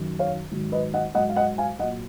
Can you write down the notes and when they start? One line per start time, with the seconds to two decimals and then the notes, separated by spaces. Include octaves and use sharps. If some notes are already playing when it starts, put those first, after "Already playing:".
Already playing: F#2 D#3 F#3
0.19 C#5 F5
0.51 G#2 D#3 F#3
0.72 B4 D#5
0.94 D#5 F#5
1.15 G#2 F#3 D#5 F#5
1.29 F5
1.36 D#5 F#5
1.58 F5 G#5
1.79 F#3 D#5 F#5
1.83 A#2